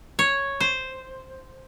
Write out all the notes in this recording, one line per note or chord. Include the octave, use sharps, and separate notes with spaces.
C#5
C5